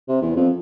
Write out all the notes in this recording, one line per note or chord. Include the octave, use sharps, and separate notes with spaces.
C3
E2
F2